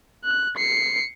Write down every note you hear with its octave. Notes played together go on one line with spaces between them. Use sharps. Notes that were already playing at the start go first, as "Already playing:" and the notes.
F#6
C7 C#7